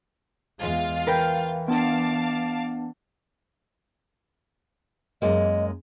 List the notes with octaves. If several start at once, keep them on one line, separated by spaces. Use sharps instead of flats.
E2 G#3 F4 F5
E3 A#4 B4 G5
B3 D4 F5 A5 D6
F#2 G#3 A#3 D#5